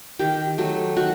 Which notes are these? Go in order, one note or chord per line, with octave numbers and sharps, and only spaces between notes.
D#3 G4
F#3 A3
D#3 F#4